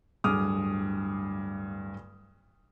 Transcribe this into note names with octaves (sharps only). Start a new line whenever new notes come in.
D1 G2 G#4 D6 D#6 F6